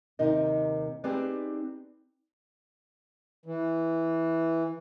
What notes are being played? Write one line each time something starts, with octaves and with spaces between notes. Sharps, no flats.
D#2 C3 D#4 A#4 D#5
C4 D#4 G4 G#4 B4 D5
E3